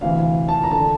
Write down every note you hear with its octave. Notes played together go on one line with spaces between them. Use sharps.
D2 C3 E3 F5
A5
A#5
D3 A5